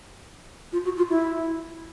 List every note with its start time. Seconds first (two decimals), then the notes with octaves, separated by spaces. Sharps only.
0.73 F4
0.84 F#4
0.97 F4
1.09 E4